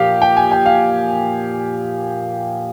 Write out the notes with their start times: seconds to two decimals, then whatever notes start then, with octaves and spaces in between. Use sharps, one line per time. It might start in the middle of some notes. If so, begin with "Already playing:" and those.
Already playing: A#2 F3 G4 F5
0.22 G5
0.37 G#5
0.52 G5
0.66 F5